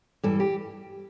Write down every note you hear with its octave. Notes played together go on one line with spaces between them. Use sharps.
G2 E3 G3 A4
G4